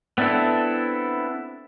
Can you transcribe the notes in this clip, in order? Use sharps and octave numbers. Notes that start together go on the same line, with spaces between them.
B3 C4 D4 E4 A4